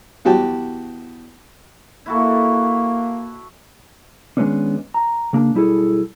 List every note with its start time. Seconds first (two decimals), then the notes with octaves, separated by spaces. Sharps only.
0.25 E2 F#4 G4 A5
2.06 A#3 E4 F#4 A4
4.37 D#3 G#3 A#3 B3 C#4 D4
4.94 A#5
5.33 C#3 A#3 D4
5.54 B1 G3 E4 G#4 A4